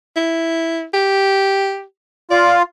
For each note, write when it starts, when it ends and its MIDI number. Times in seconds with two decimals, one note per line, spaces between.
0.16 0.84 64
0.94 1.82 67
2.31 2.62 65
2.31 2.55 74